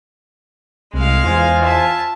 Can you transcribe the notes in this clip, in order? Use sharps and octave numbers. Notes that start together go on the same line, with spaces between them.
C2 G#3 F5
E2 F4 C5 G#5
E5 A5